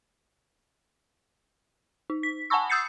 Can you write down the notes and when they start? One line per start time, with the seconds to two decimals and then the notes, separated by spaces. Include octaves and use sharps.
2.10 D#4
2.23 B6
2.50 F#5 G#5 A5 B5 C#6 E6
2.70 D#6 E6 G6 A6 C7 C#7